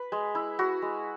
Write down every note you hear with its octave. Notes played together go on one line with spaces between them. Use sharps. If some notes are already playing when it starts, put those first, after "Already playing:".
Already playing: B4
G#3
E4
E4 F#4
G#3